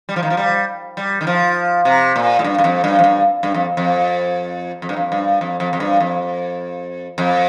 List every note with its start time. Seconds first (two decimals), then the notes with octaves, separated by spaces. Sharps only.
0.09 G3
0.16 F3
0.23 D#3
0.30 F3
0.37 G3
0.97 G3
1.21 D#3
1.27 F3
1.85 C3
2.16 A#2
2.39 A2
2.44 G2
2.58 G2
2.64 F2
2.84 G2
2.99 F2
3.04 G2
3.43 G2
3.54 F2
3.77 F2
4.82 F2
4.89 G2
4.97 F2
5.12 G2
5.41 F2
5.60 F2
5.73 F2
5.80 G2
6.00 F2
7.18 F2